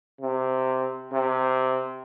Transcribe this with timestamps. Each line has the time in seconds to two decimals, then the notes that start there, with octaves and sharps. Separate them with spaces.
0.21 C3
1.12 C3